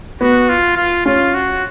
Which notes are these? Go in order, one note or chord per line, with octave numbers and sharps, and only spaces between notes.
B3 F#4
F4
F4
C#4 F4
F#4